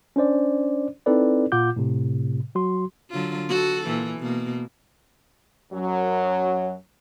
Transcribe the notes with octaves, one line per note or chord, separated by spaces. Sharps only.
C#4 D4 C5 D5
C4 D#4 E4 A4 B4 D5
A#2 F4 F#5 D6 G6
A2 C3
F#3 F#4 C6
D3 F#3 F4
F#4 A4
A#2 E3
B2 A#3
F#2 F#3